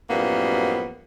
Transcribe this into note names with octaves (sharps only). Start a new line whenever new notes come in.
F#2 A2 F3 G3 A#3 B3